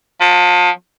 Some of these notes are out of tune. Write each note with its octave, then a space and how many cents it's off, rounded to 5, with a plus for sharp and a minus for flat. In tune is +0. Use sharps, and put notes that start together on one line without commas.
F3 +35